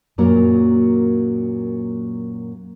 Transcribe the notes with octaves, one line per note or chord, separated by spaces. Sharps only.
F#2 A#2 F#3 A#3 A#4